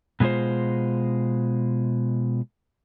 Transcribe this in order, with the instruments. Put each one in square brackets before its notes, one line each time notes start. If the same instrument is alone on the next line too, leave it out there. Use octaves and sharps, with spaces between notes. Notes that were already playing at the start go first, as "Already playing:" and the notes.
[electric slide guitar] B2 G#3 A#3 F4 C5